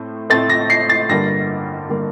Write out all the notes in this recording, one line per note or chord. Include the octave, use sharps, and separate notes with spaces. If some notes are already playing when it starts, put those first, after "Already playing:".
Already playing: A2 A3 C4
A2 A3 C4 A6
A#6
C7
A6
G2 D3 G3 A#3 A#6
D3 G3 A#3